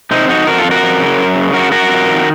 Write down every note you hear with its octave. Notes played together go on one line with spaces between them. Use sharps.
C3 C4 D#4
F2 D#4 F#4
F2 F#4 A#4
F4 A4
F2
F#4 A#4
F2
C#3
F#2
C#3
F#2 F#4 A#4
F#2 F#4 A#4
F2
D#3